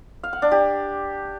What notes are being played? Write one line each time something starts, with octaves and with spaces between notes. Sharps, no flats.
F5
F#5
D4
G4